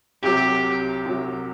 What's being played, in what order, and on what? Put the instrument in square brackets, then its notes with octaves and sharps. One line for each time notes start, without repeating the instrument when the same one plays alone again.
[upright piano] C2 C3 F#3 [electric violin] G4
[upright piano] C2 C3 F#3